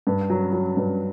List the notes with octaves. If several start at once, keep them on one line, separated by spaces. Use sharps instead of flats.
G2
F#3
F#3
G2